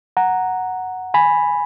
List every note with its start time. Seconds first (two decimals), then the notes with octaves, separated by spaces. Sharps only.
0.17 F#5 A#5
1.14 G#5 B5